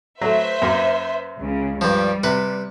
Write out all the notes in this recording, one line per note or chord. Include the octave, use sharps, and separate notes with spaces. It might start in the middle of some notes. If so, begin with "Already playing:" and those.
F#3 A3 B4 C5 E5
F#2 A#3
C#2 C#3
G2 F3 G3
C3 B4